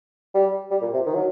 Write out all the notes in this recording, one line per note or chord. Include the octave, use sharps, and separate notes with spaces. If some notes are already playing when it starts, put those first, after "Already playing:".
G3
G3
A#2
C3
D#3
F#3